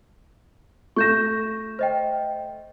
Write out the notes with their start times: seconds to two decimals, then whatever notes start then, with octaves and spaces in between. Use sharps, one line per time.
0.96 A3 C#6 G6 A#6 E7
1.79 C5 D#5 G5